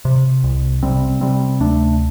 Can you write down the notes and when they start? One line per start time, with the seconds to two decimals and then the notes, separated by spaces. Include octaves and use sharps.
0.05 C3
0.44 C2
0.83 C3 G3 C4
1.21 C3 G3 C4
1.60 D2 A3 D4